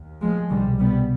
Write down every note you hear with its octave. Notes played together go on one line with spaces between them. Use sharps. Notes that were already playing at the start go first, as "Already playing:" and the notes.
Already playing: D#2
F3 G#3
C2 B2 D#3 G3
G3 B3